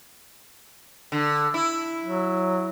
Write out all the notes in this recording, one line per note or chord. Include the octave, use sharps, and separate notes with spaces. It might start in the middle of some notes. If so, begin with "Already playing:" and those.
D3
E4
F#3